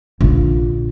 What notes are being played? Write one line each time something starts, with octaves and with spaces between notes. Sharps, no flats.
A#1 D3